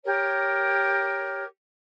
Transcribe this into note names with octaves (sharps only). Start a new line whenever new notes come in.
G4 A#4 C#5